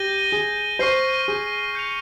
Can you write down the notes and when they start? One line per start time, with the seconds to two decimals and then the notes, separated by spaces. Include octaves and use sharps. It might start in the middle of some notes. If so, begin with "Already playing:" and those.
Already playing: G4 G6 A#6 D#7 G7
0.32 G#4
0.79 C5 C#6 F6 C7 D#7 G7
1.28 G#4
1.75 G6 C#7 F7